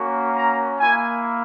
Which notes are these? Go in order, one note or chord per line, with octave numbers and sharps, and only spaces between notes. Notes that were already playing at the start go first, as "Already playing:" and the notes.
Already playing: A#3 C#4 F#4
A#5
A#3 E4 G#5